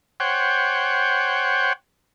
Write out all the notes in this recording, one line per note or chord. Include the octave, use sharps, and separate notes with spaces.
C5 C#5 F#5 G5